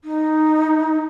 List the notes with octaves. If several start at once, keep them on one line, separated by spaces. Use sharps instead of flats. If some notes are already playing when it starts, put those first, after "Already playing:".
D#4